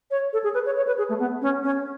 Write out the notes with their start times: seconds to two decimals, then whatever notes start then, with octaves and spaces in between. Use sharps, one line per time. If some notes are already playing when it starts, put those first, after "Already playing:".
0.11 C#5
0.33 A4
0.44 G#4
0.54 B4
0.66 C#5
0.76 C#5
0.87 B4
0.98 G#4
1.09 A3
1.19 B3
1.42 C#4
1.63 C#4